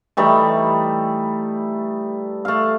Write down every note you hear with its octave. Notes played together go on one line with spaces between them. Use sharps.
E3 G3 A3 D#4
A3 F5